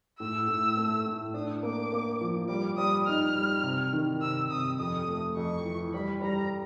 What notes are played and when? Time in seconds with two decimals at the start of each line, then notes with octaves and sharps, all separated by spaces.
0.19 A2 E6
0.48 A2
0.77 A3
1.06 A2
1.34 D4 D#6
1.63 A#3 D6
1.92 A#3
2.21 F3
2.48 G3 D6
2.77 G3 D#6
3.06 D#4 F6
3.36 G3
3.64 C3
3.93 D#3
4.21 C3 E6
4.50 C3 D#6
4.79 F2 D#6
5.07 A3
5.36 F2 C#6
5.64 E3
5.93 G3 B5
6.22 G3 A#5